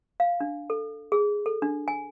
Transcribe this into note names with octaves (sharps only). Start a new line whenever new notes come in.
F5
D4
A4
G#4
A4
D4
G#5